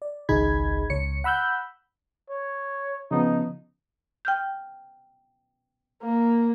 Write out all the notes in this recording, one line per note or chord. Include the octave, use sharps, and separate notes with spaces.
D5
G#1 C#2 D#4 G#4 B5 G#6
C#2 C#5 C#7
F#5 B5 E6 F#6 G6
C#5
C#3 F3 B3 D#4
G5 F6 G6
A#3